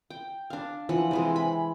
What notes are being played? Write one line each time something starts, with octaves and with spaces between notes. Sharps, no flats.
G5
D4 F5
E3 F3 F#5
C3 E3 G#3
B5